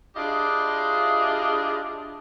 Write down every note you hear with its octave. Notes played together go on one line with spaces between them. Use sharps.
D4 E4 F4 G4 G#4 D#5